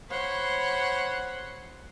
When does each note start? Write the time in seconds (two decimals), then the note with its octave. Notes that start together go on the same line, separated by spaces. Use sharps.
0.10 C5 C#5 F#5 B5 C6